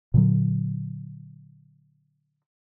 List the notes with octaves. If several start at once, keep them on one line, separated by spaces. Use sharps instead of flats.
A#2 D3 F#3